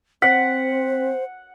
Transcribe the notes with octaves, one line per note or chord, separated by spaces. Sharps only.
C4 C5 F#5 B6